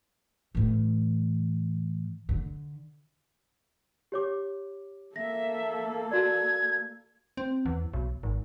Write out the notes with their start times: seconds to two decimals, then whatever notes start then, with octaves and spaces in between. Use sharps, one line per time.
0.55 A2 E3
2.29 D3
4.12 G4 C#5 D6
5.16 A#3 A4 E5 A#6
6.11 F#4 D5 G#6
7.37 C4
7.66 E2
7.93 B1
8.23 G#1